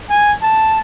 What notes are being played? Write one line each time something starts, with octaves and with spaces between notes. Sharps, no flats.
G#5
A5